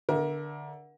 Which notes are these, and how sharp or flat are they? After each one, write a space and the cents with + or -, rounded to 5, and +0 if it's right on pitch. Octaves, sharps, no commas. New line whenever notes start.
D3 +0 A#4 +30 E5 +0